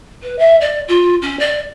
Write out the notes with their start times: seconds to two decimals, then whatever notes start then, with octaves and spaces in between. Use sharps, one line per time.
0.23 B4
0.38 E5
0.61 D5
0.88 F4
1.21 C#4
1.39 D5